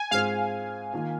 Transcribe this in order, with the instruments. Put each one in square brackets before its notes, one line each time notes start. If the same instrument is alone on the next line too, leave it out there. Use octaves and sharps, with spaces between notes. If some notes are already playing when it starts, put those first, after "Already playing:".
Already playing: [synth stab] G#5
[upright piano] G#2 G#3 C4 F4 [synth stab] F5
[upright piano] D#3 A#3 F4